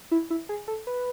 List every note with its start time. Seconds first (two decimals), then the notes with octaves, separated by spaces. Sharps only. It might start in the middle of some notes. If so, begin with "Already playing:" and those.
0.11 E4
0.30 E4
0.49 G#4
0.68 A4
0.87 B4